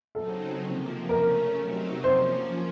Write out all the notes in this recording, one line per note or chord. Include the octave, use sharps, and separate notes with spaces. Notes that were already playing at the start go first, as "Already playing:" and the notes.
C#3 F#3 C4 D#4 A4
C3 F3 A#3
C#3 A3 C#4 A#4
C3 F#3 C4 D#4
F3 A#3 C#4 C5